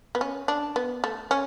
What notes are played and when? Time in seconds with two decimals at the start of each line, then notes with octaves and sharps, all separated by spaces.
0.15 B3
0.21 C#4
0.48 D4
0.76 B3
1.04 A3
1.31 C#4